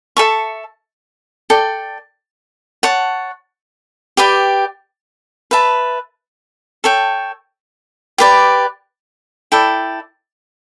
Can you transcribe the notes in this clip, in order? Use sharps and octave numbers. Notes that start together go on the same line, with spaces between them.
A4 E5 A5 C#6
A4 D5 G5
C#5 F#5 A5
G4 B4 D5 G5
B4 E5 A5
A4 C#5 G5
G4 B4 D5
E4 A4 D5 G5